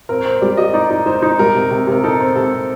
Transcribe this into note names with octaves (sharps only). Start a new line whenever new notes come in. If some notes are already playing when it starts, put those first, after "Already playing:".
C4 A#4
C4 C5
G3 D5
G3 D#5
D#4 D5
D#4
D#4 C5
D#4
G3 A#4
C3
C3
C3 A#4
D#4 A4
C4
C3 A4
C4